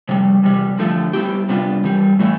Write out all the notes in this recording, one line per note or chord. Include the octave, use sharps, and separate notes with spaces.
F2 C3 G3
E2 C3 G3
D3 F3 A3
G3 B3 E4 G4
C3 G3 B3 D4 F4
G2 E3 G3
A2 E3 A3 E4